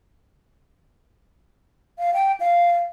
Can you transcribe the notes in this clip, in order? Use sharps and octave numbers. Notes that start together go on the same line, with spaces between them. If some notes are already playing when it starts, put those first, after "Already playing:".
F5
G5
F5